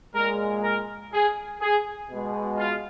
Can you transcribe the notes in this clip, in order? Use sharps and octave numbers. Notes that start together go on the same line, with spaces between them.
A#2 G#3 A#4
A#4
G#4
G#4
B2 G#3
F4